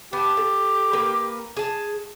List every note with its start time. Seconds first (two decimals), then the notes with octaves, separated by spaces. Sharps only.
0.13 B3 G4 A5
0.37 A4
0.93 A#3 B4
1.57 G#4 A5